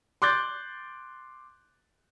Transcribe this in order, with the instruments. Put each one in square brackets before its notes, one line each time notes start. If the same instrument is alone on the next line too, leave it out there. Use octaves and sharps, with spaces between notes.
[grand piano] C6 D6 F#6 G6 A6